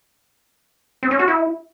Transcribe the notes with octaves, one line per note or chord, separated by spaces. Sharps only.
C4
C#4
F#4
E4